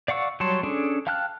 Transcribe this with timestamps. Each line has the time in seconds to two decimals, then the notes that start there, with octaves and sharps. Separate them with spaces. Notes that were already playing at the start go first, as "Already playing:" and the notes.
0.08 D5 F5 F#5 C#6 E6
0.40 F#3 G3 C#5 A5 C6
0.63 C#4 D4 G#4 A4
1.07 F5 G5 A5 F6 F#6